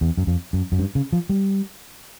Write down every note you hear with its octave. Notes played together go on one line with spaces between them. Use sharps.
E2
F#2
F2
F#2
F#2
G2
C#3
F3
G3